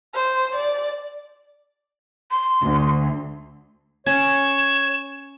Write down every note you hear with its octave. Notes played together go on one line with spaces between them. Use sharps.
C5
D5
C6
D2
C#4 C#5 G#6 E7